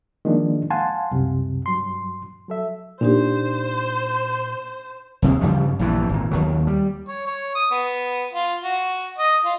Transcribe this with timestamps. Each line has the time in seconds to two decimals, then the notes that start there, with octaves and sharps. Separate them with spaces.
0.25 D#3 F3 G#3 A#3 D4
0.70 F5 F#5 G#5 A5 C6
1.11 C2 F#2 C3
1.66 G2 F#3 C6
2.49 F#3 A4 E5
3.01 A#2 D4 D#4 G4 C5
5.22 D#2 C3 G#3
5.41 G2 C#3 F3 G3
5.79 A#1 G2 E3
6.09 G#1 A#2
6.31 D#2 D#3 F#3
6.67 G3
7.08 C#5
7.27 C#5
7.55 D#6
7.71 B3
8.33 F4
8.63 F#4
9.18 D#5
9.45 F4